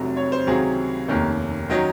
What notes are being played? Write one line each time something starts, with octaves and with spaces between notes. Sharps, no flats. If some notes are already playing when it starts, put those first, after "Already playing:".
Already playing: F1 F2 C3 F#3
C#5
C5
C#2 C3 D#3 F#3 C4 G#4
F1 D#2 D#3 A#3 C#4
D#3 F#3 C#4 D#5